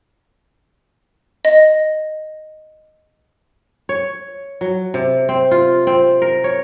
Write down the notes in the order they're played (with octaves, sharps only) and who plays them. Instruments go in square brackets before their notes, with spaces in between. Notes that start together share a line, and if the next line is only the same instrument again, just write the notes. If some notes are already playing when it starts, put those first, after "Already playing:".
[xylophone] D#5
[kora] C#5
F#3
C3
C4
F4
C4
A#4
C#5